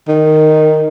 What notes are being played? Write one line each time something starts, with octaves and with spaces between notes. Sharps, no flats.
D#3